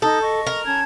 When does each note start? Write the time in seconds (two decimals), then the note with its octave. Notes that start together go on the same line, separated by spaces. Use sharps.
0.02 D#4 A4 D#6 G6
0.20 D#5 C#6
0.47 A#4
0.66 C#4 A5 G#6